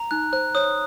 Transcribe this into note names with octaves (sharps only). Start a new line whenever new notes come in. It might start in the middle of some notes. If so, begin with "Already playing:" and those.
Already playing: A#5
D#4 F#6
C5 F#6
C#5 D#6